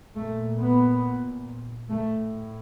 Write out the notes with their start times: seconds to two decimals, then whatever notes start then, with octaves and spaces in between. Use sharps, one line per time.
0.16 A#2 A3
0.60 B3
1.89 A2 A3